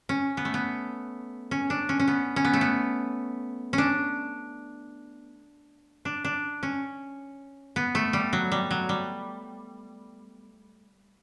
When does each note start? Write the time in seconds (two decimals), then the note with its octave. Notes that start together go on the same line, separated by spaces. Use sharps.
0.09 C#4
0.37 B3
0.45 A3
0.54 B3
1.51 C#4
1.70 D4
1.89 C#4
2.00 C#4
2.08 B3
2.36 C#4
2.45 B3
2.53 A3
2.61 B3
3.73 C#4
3.78 D4
6.05 D4
6.25 D4
6.63 C#4
7.76 B3
7.95 A3
8.13 G3
8.33 F#3
8.52 G3
8.71 F#3
8.89 G3